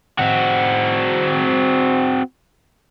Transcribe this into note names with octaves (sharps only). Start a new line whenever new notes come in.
C4 F#4